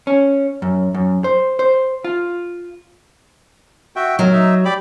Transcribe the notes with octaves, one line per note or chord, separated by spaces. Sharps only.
C#4
F#2
F#2
C5
C5
F4
F#4 E5 G5
F#3 A#4
D#4 E5
G4 D5 B5